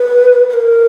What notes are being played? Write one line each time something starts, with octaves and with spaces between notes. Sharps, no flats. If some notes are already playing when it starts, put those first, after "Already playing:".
Already playing: B4
B4
A#4